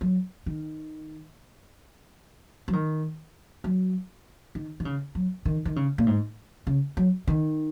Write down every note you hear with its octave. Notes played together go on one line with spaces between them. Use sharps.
F#3
D#3
F#3
D#3
F#3
D#3
D#3
C#3
F#3
D#3
D#3
C#3
A#2
G#2
C#3
F#3
D#3